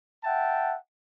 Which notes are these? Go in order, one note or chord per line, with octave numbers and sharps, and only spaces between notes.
E5 F#5 G5 A5